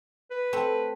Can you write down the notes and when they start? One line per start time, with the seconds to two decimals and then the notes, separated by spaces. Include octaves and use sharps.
0.31 B4
0.53 A3 C4